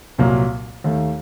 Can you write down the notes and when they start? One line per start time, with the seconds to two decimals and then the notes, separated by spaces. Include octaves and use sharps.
0.18 C2 A#2 F#3 A#3
0.84 D#2 D#3 A3